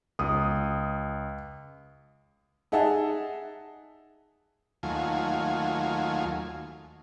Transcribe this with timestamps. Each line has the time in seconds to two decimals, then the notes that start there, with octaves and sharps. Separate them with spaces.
0.19 C#2 D#6
2.72 D#4 G#4 E5 F#5 A5
4.83 D#2 F#3 A3 F4 G#5